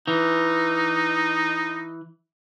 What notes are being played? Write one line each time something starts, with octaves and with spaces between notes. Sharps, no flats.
E3 D#4